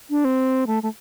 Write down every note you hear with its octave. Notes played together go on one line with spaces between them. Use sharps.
D4
C4
A3
A3